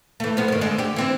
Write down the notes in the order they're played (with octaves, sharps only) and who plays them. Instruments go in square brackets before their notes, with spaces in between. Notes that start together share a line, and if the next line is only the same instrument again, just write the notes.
[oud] E3 A3
F3 B3
G2 D#3
D3 G#3
D3 G4
E3 C4